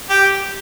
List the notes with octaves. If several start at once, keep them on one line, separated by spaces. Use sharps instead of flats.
G4